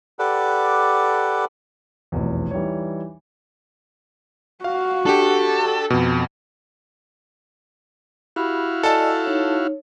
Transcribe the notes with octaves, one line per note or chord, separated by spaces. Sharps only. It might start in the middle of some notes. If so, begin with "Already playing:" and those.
G4 A4 B4 D5 F#5
F1 B1 E2
E3 G3 D#4 C#5
F#4 F5
D4 G4 A4
F2 B2
E4 F#4 G4 F5 B5
A4 D5 D#5 G#5 A5
D#4 C#5